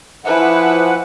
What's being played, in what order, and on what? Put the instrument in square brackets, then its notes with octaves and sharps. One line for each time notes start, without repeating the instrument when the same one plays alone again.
[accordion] E3 F3 F#5 [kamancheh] E4 B4